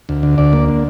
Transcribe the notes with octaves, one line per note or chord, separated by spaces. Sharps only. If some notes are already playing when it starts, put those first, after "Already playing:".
D2
D3
D2 D5
A#3
D3